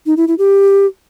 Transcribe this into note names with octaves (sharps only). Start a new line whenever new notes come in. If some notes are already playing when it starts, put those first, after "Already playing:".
D#4
E4
E4
G4